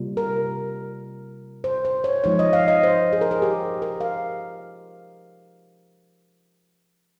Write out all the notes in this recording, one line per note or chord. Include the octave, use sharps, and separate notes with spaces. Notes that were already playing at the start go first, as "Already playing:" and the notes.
Already playing: C3 G3 A#3 F4
A#4
C5
C5
C#5
F3 G#3 D#4 C#5
D#5
F5
D#5
C5
G#4
A#4
G#4
G4
A#4
F5